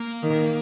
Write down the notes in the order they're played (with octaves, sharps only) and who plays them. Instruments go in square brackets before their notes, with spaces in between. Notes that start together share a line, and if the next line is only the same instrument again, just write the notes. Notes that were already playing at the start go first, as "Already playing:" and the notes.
Already playing: [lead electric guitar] A#3
[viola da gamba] D#3